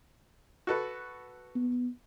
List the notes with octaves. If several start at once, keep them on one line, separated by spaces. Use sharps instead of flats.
F#4 A4 B4
B3